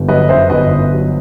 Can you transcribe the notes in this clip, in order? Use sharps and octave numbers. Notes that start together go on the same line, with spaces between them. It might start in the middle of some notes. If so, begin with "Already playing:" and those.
Already playing: G1
F#3 B4 D#5
F#2 C5 E5
G1 B4 D#5
G1
F#3